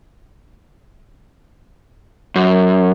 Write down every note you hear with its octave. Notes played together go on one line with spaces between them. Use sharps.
F#2